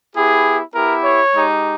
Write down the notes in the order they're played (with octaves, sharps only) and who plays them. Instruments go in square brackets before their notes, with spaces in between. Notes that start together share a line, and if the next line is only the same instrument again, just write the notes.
[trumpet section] B3 E4 G4 G#4
B3 E4 G4 A#4
C#5
G#3 D#4 G4